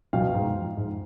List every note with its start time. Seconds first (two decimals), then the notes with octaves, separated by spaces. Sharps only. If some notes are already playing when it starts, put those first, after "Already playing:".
0.13 B2 F#3 F5 G5
0.35 G#2
0.56 F3
0.77 G#2